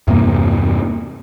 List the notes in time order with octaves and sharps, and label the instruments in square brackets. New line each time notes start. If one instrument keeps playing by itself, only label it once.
[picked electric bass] E2 G2 C3 A#3